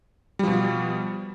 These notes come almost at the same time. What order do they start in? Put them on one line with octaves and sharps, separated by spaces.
G3 F3 B2